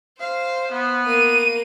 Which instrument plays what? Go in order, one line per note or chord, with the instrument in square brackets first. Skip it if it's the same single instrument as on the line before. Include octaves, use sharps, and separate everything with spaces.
[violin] C5 [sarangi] F5
[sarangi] B3
[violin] A#3 D#7